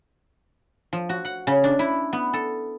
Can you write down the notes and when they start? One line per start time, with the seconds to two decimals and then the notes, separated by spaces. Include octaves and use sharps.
0.93 F3
1.09 F#4
1.25 F#5
1.47 C#3
1.64 D4
1.79 E4
2.13 B3
2.33 A4